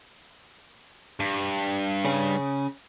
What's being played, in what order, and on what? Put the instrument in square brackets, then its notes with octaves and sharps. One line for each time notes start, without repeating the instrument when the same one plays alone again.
[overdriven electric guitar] G2
[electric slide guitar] C#3 C#4